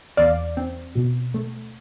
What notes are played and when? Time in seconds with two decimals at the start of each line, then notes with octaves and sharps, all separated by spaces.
0.17 E2 D5 F5
0.57 C4
0.95 B2
1.34 A3